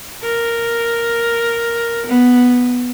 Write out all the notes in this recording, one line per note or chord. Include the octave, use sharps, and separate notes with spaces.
A#4
B3